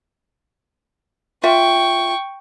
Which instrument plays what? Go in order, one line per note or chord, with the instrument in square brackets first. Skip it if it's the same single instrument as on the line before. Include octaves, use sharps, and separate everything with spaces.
[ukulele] F4 E5 [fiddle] G5 C#6